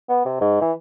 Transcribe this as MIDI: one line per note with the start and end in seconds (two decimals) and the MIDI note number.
0.09 0.23 59
0.25 0.38 48
0.41 0.58 44
0.61 0.72 52